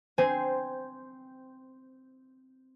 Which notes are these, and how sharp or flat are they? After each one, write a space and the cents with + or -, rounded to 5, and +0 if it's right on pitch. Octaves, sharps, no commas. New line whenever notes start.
C4 -5 C5 -15 G#5 +0